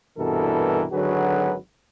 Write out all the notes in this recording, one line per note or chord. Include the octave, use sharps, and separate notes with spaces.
C2 G2 B2 E3 A4 A#4
G#1 D3 F#3 F#4 G#4 B4